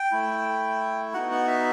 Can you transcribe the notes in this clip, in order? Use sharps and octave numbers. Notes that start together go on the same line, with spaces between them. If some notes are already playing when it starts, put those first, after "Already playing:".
Already playing: G5
A3 E4
B3 D#4 F#4 F#5
F#5
E5